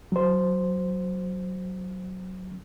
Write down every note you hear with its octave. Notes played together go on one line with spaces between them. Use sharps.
F#3 C5